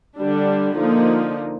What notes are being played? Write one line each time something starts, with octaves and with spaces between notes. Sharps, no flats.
D3 G3 D4
D3 F3 A#3 D#4